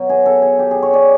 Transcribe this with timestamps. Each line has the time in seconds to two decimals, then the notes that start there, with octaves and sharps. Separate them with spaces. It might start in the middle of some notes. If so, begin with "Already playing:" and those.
Already playing: B2 F#3
0.09 G#4
0.26 A4
0.42 G#4
0.59 G4
0.71 G#4
0.83 C#5
0.94 D5